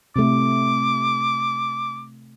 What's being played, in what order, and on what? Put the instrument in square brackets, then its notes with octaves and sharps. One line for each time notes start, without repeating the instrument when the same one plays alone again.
[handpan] C3 A3 [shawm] D6